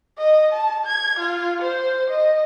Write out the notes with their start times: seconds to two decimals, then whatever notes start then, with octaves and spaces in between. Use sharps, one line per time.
0.18 D#5
0.53 A5
0.86 G#6
1.19 F4
1.62 C5
2.11 D#5